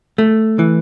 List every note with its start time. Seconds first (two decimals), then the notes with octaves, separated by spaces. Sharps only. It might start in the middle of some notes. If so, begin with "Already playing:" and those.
0.18 A3
0.59 E3